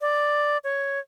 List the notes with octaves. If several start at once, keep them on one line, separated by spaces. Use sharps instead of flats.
D5
C#5